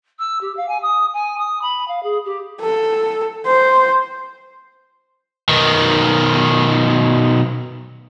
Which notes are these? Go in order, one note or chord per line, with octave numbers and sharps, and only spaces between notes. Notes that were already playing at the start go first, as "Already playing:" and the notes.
E6
G4
F5
G#5
D#6
G#5
D#6
B5
F5
G#4
G4
A4
C5
B2 D#3